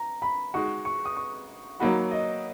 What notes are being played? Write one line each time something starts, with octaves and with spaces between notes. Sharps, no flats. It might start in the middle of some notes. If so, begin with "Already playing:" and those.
Already playing: A#5
B5
G#3 D#4 F#4 C#6
C#6
D#6
C#6
F#3 A#3 D#4 F#4 B5
D#5